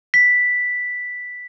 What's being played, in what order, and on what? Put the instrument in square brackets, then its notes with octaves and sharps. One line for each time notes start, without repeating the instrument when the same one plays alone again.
[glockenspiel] B6